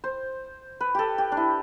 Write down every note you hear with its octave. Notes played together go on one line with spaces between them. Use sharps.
C5
B4
G4 A4
G4
D4
E4